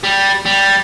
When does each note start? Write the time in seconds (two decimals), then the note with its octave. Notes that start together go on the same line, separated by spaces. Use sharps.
0.04 G3
0.46 G3